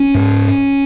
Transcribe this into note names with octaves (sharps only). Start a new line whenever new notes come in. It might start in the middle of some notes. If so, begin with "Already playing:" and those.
Already playing: C#4
G#2